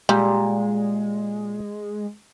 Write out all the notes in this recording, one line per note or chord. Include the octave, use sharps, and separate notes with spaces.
A#2 G3 G#3 G4